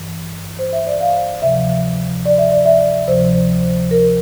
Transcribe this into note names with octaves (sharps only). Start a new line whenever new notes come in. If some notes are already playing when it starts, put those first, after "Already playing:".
Already playing: G2 E3
C5
E5
D5
F5
D2 C3 F3 E5
D5
E5
D5
E5
D5
D2 C3 F3 C5
A#4